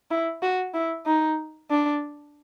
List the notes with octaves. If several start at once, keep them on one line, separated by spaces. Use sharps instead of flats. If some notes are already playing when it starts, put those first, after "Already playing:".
E4
F#4
E4
D#4
D4